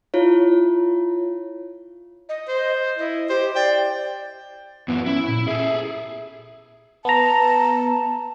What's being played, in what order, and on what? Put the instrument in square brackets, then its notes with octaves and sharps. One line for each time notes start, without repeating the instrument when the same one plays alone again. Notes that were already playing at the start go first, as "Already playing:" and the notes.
[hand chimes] E4 F4 C#5
[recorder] D#5
[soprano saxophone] C5
[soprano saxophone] E4 [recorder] D#5
[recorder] G4 [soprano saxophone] C5
[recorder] D5 [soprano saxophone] G5
[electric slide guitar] F#2 E3 [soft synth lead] B3
[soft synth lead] C#4 [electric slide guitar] E4
[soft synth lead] A#2
[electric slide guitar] G#4 A4 [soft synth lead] E5
[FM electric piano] B3 A#5 [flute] A5